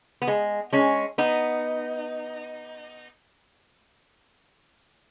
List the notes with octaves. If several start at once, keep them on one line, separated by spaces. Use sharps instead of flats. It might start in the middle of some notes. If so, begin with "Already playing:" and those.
B3
G#3
G#3 C#4
B3 D#4